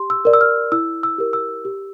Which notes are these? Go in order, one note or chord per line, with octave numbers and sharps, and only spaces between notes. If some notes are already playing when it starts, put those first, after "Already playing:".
Already playing: G4 C6
E6
A#4 D5
E6
F6
E4 E6
E6
G4 A#4
E6
G4